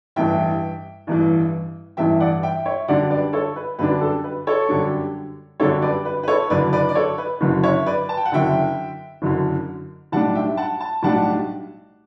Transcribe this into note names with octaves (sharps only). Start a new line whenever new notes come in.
A1 G2 E3 E5 G5
A1 G2 E3
A1 G2 E3 E5 G5
D5 F#5
E5 G5
C#5 E5
F#2 D3 G3 D4 D5 F#5
B4 D5
A4 C#5
B4
F#2 D3 G3 D4 B4
A4
B4
A4 C#5
F#2 D3 G3 D4
F#2 D3 G3 D4 A4 C#5
B4 D5
B4
B4
A4 C#5
F#1 F#2 D3 B4 D5
B4 D5
D5
A4 C#5
B4
F#1 F#2 D3
C#5 E5
B4 D5
A5
G5
F#5
F#1 F#2 D3 E5 G5
F#1 F#2 D3
B1 A2 G3 D4 F#5 A5
E5 G5
F#5 A5
A5
B1 A2 G3 D4 F#5 A5